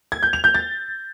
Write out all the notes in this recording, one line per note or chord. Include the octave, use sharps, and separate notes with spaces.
G#6
G6
F7
G6
A6